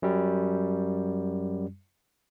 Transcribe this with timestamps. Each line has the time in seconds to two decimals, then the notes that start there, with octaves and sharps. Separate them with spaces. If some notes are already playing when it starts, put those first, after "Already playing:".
0.02 F#2 G3